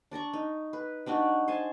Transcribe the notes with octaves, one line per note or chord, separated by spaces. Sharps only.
D4 D5 A#5 C#6
D#4
B4
G3 D4 D#4 F#4
C5 G#5 A5